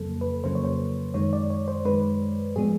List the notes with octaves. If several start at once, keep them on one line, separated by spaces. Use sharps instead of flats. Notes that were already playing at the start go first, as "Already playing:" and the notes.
Already playing: F2 C#3 F#3 A#3 A4
B4
F2 C#3 F#3 A#3 C5
C#5
C5
F#2 D#3 G#3 C#5
D5
C#5
C5
F#2 D#3 G#3 B4
A2 F3 G#3 B3 G#4